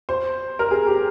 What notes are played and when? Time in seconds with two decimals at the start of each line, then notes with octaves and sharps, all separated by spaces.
0.09 C5
0.59 A#4
0.71 G#4
0.87 G4